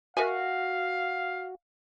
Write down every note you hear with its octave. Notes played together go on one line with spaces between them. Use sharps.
F#4 A#4 E5 F5 G#5